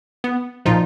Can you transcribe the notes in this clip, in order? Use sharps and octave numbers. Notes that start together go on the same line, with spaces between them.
B3
A#2 F3 D#4 F4